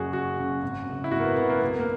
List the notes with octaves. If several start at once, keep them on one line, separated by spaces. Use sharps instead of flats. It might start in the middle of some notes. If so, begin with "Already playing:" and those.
Already playing: F#1 F#2 C#3 F#3 F#4 G#4
F#1 F#4
F#2 C#3 F#3
G#1
F#2 C#3
E4
G#1 F#4
A#3
B3
F#2 C#3 B3
A#3
B1 A#3
A#3